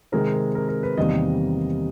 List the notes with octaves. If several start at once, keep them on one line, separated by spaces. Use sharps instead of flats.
C3 D#3 G#3 C4 A#4
A#4
A#4
A#4
B4
E2 C3 D#3 G3 A#3 D#5